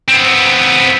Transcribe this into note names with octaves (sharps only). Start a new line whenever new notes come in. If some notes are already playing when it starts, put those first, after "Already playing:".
B3 C4